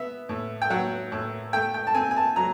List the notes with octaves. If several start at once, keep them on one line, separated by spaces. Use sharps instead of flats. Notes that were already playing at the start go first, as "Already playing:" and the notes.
Already playing: B3 E5
A2
G5
F#3 F#5
A2
A3 G5
G5
A5
C4 G#5
G#5
A5
F#3 A#5